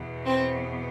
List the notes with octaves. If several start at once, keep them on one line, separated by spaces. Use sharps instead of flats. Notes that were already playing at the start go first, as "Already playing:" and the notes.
Already playing: E2 B2
C4